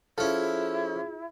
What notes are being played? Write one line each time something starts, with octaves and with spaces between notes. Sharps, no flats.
F3 C#4 E4 F4 G#4 A4